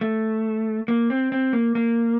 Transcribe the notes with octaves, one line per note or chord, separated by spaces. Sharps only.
A3
A#3
C4
C4
A#3
A#3